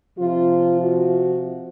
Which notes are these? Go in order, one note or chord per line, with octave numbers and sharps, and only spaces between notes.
C3 F3 F4
F#4